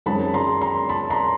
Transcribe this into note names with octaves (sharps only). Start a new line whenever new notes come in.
F#2 D#3 G#3 C4 A5 B5
A#5 C6
A#5 C6
A5 B5
A#5 C6